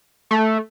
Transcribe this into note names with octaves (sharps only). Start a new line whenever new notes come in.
A3